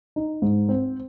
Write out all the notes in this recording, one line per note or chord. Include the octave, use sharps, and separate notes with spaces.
D#4
G#2
C4